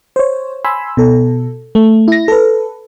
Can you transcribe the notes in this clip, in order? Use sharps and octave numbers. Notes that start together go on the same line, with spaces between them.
C5 C#5
G#5 B5 C6 E6
B2 A4
A3
E4 A#6
A4 B4